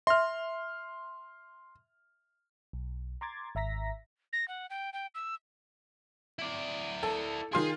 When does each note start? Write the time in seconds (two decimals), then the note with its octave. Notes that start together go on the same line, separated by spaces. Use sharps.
0.07 E5 C6 F6
2.73 B1
3.21 A#5 C6 D6 G#6 A6
3.55 G#1 E5 A#5 A#6 B6
4.33 A#6
4.48 F#5
4.70 G5
4.93 G5
5.15 E6
6.39 E4 D5
7.03 A4
7.53 D#3 F4 G#4 C6